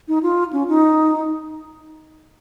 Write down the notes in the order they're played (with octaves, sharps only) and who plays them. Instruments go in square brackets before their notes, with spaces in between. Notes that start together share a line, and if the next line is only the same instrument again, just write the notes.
[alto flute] D#4
F4
C#4
D#4